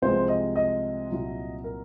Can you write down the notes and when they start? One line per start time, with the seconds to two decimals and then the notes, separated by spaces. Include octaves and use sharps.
0.02 C2 C3 F3 G#3 C5
0.28 D#5
0.56 D#5
1.10 C2 A#2 F#3
1.64 A#4